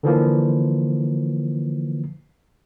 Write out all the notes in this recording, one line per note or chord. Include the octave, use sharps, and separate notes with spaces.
D3 E3 F3 A#3